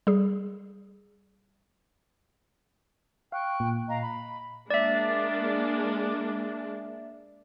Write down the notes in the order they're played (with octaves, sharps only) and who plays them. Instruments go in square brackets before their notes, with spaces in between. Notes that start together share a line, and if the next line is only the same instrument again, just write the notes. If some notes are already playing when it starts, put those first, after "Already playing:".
[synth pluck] G3 G#4
[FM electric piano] F5 [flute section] G5 C#6 F#6
[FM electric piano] A#2
[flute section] D#5 F5 A#5
B5
[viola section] G#3 A#3 D4 [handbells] D5 E5